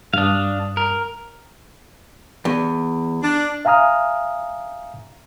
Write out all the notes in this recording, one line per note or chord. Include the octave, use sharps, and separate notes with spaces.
G2 D4 F5 D#6
A#4
E2
D4
E5 F5 G#5 A#5 D#6 F6